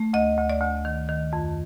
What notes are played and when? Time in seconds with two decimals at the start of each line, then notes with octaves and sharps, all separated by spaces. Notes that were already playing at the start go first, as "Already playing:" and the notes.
Already playing: A3
0.14 D2 D#5
0.38 D2
0.50 D5
0.61 D2
0.85 D#3
1.09 D#3
1.33 F2